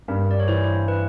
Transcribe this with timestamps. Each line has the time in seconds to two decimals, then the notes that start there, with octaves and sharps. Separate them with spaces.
0.08 G2 A#4
0.31 D5
0.40 C#5
0.48 E3 C5
0.88 B4